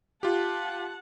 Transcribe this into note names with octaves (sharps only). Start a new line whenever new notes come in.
F4 G4 F#5 A5